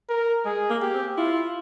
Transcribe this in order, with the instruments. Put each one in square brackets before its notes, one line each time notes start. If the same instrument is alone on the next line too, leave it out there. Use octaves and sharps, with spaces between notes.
[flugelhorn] A#4
[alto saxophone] G#3 [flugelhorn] G#4
[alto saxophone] A#3
[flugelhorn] G4
[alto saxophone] C4
[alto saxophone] E4 [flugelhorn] F4